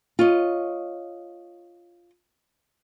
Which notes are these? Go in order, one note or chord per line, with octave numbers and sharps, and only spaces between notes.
F4 C#5 D#5